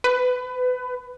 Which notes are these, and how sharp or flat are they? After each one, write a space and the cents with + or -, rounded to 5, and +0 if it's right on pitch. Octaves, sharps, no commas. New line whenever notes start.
B4 +25